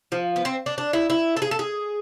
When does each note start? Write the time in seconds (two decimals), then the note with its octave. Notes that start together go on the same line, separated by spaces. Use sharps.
0.12 F3
0.36 B3
0.45 C4
0.66 D4
0.78 D4
0.93 E4
1.10 E4
1.37 A4
1.42 G#4
1.51 A4
1.59 G#4